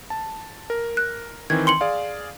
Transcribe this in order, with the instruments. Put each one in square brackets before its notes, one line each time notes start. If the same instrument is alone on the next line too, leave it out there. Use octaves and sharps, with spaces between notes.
[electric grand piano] A5
A#4
[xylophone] F#6
[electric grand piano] D#3 E3 C4 [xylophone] G#6
[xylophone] C6 C#7 F#7
[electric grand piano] G#4 D5 F5